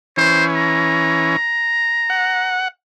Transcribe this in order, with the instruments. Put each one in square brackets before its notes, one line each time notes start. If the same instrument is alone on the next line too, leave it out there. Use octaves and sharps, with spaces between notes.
[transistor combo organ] E3 C#4 [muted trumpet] C5
[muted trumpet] A#5
[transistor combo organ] F#5